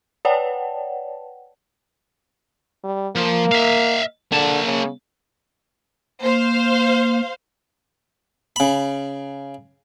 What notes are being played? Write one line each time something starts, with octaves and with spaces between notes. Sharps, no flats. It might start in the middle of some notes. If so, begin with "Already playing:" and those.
B4 C#5 D5 F#5 G5 A5
G3
F3 A#3
E5 F5
D3 A#3 A5
C#3
A#3 C5 F5
C#3 B5